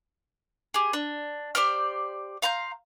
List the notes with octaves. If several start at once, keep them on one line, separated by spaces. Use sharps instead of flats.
G4 G#4
D4
G4 C5 D5 F6
F5 A#5 C6 G6